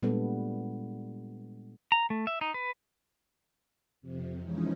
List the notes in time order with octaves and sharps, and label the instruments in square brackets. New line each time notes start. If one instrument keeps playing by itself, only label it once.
[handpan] A#2 G3 G#3 B3 D4 A4
[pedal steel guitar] A#5
A3
E5
D#4
B4
[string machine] F2 C3
E3 F3 G#3 C#4 D#4